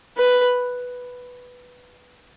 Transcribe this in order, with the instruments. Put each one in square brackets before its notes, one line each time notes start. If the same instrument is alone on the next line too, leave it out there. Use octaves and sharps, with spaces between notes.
[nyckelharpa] B4